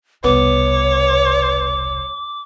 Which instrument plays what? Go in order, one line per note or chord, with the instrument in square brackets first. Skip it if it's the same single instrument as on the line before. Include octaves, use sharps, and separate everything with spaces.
[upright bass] E1 C2 [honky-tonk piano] B3 [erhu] C#5 [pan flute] D6